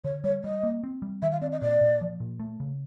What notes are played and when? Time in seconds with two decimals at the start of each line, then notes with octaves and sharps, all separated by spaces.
0.04 D3 C#5
0.24 G3 C#5
0.44 G3 D#5
0.63 A#3
0.84 C4
1.02 G3
1.22 D#3 E5
1.31 F5
1.41 C4 D5
1.52 D#5
1.61 A#2 D5
1.81 A#2
2.01 F3
2.20 A#2
2.40 A3
2.60 C#3